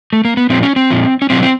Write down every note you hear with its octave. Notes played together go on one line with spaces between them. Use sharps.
A3
A#3
B3
A#2 F3 C4
C#4
C4
A#2 F3
C#4
B2 F#3 C4
C4